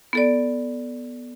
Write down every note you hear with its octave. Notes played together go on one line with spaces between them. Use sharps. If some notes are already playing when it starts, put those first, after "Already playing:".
B3 A4 D5